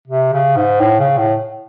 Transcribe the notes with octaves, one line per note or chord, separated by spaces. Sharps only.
C3
C#3
G#2
A2
C#3
A2